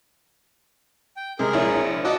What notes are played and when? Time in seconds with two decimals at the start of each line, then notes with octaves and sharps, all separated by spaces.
1.17 G5
1.39 C3 G#3 G#4 A#4
1.53 A#1 E4 C#5
2.05 F#4 D#5 A5 D6 E6